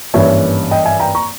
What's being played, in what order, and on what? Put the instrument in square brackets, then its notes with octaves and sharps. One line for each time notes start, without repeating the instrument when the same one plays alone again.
[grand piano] G#1 G2 E3 A#3 C#4 C#5 E5
D#5 G5
E5 G#5
G5 A#5
A#5 C#6